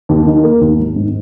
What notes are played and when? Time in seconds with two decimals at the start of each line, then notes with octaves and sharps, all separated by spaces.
0.09 D#2
0.26 D#3
0.44 A#3
0.61 D#2
0.78 G#1
0.96 G#2